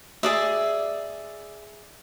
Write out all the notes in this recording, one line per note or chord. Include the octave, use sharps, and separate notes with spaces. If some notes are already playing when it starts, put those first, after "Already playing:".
G#4 D5 E5